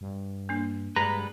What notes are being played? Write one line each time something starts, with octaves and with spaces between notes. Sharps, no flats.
G2
A#3 D4
G2 G3 G#3 B4 A#5